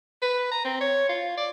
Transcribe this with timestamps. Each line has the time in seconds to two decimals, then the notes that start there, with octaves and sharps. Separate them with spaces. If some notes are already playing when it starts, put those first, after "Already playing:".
0.22 B4
0.51 A#5
0.65 C4
0.81 C#5
1.09 F4
1.38 D5